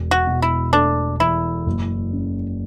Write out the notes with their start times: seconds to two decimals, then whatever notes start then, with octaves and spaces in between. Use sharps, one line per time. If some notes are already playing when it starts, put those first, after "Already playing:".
Already playing: E1
0.11 F#4
0.27 B2
0.42 E4
0.73 A3 D4
1.20 E2 E4
1.66 F#1
2.13 C#3